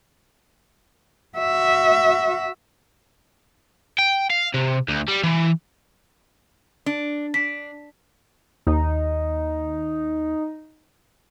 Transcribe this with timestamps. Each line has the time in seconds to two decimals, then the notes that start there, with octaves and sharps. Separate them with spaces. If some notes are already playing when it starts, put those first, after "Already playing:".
1.38 F#4 E5
3.98 G5
4.30 F5
4.54 C3
4.89 D2
5.08 G3
5.23 E3
6.86 D4
7.34 D4 B6
8.67 D#2 D#4